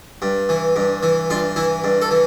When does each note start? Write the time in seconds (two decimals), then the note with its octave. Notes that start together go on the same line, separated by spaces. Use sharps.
0.22 G2
0.49 E3
0.76 G2
1.03 E3
1.30 G2 F4
1.56 E3 E4
1.84 G2
2.02 A4
2.11 E3